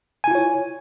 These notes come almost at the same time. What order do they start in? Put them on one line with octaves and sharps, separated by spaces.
G#5 E4 F4 C#5